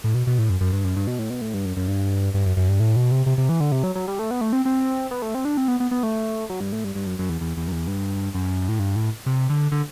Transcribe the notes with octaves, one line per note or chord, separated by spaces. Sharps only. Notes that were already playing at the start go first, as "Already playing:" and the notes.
A2
B2
B2
A2
F#2
F#2
G2
F#2
G2
B2
A2
B2
A2
G2
F#2
F#2
G2
G2
F#2
F#2
G2
A2
B2
C3
C3
C3
E3
D3
C3
F#3
F#3
G3
A3
B3
A3
C4
C4
B3
A3
C4
D4
C4
B3
B3
B3
A3
F#3
G2
A2
G2
G2
F#2
F#2
E2
E2
E2
F#2
E2
G2
F#2
A2
G2
A2
C3
D3
D3